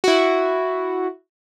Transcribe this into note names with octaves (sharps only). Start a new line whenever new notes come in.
E4 F#4